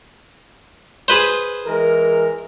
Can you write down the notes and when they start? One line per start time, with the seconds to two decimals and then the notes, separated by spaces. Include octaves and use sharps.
1.08 G#4 B4 C5
1.66 E3 G#3 A#4